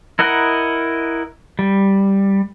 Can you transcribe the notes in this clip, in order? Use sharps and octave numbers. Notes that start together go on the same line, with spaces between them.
E4 A#4 D#5 F#5
G3